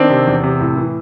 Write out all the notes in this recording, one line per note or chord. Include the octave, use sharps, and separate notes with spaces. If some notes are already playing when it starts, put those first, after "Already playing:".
Already playing: D#3 C4 D4
C3
E2
C3
A2
E3